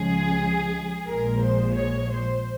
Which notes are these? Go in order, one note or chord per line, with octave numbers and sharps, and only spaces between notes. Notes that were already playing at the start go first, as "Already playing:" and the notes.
Already playing: C#2 C#3 F3 G#3 G#4
A#1 A#2 F3 G#3 A#4
C5
C#5
C5